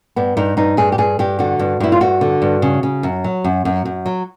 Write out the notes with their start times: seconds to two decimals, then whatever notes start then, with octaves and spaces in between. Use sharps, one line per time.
0.16 G2 B3
0.37 G2 D#4
0.57 G2 D#4
0.77 G2 G#4
0.92 G4
0.98 G2 G#4
1.19 G2 G4
1.39 D3 F#4
1.59 G2
1.80 G2 E4
1.92 F4
2.01 G2 F#4
2.21 D3
2.42 G2
2.62 C#3
2.83 C#3
3.03 F#2
3.24 F#3
3.44 F#2
3.65 F#2
3.85 F#2
4.06 F#3